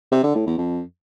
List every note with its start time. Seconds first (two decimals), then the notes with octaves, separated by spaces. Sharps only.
0.12 C3
0.23 D3
0.35 A2
0.46 E2
0.58 F2